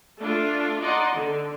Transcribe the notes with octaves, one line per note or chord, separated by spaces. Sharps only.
A3 D4 F4
D#4 D5 D#5 F#5 C6
D3